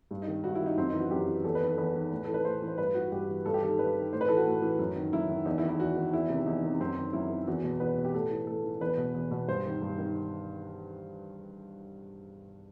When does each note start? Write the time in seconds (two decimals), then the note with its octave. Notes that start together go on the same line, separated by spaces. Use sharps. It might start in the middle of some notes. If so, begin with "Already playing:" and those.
0.11 G2
0.22 D#4
0.28 D#3
0.44 G2 F#4
0.55 E4
0.61 D#3
0.66 D#4
0.77 F#2 C4
0.89 D#4
0.94 E3
1.00 F#4
1.11 F#2 G4
1.27 E3
1.44 E2 A4
1.55 B4
1.61 D#3
1.67 A4
1.78 E2 B4
1.94 D#3
2.12 A2
2.25 E3 A4
2.34 B4
2.45 A2 C5
2.62 E3
2.68 C5
2.78 G2 B4
2.94 E3 F#4
3.12 G2 G4
3.29 E3
3.46 G2 A4
3.54 G4
3.63 D#3 A4
3.79 G2 B4
3.95 D#3
4.13 A2 C5
4.21 B4
4.28 E3 A4
4.37 F#4
4.45 A2
4.62 E3
4.79 F#2
4.96 D#3
5.13 F#2 E4
5.29 D#3
5.46 E2 D#4
5.58 E4
5.63 D#3
5.69 E4
5.79 E2 F#4
5.96 D#3
6.13 E2 E4
6.29 C3
6.35 D#3
6.46 E2 D#4
6.63 C3 D#3
6.80 F#2 C4
6.97 D#3
7.13 F#2 E4
7.30 D#3
7.47 E2 F#4
7.64 B2
7.80 E2 B4
7.97 B2
8.05 G4
8.14 A2 A4
8.31 E3
8.47 A2 A4
8.64 E3
8.81 E2 B4
8.97 B2
9.15 E2
9.31 B2
9.48 G2 C5
9.65 D#3
9.82 G2
9.98 D#3